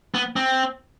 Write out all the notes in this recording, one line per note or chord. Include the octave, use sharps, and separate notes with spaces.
B3
C4